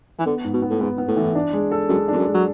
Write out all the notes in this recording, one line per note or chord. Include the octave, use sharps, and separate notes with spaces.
E3
D3 B3
G#2
B2
B3
A2
G#2 B3
B3
A2
E3
D4
G#3
A4
F#2 G#3
E2 D4
F#2
G#3
F#3